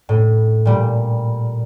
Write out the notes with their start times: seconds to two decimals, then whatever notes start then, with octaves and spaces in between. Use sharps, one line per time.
0.09 A2
0.65 A#2 G3